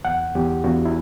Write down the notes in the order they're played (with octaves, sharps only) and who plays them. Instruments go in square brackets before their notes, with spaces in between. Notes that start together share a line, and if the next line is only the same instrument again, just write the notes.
[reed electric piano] E2 F#5
E2 G4
E2 F#4
E4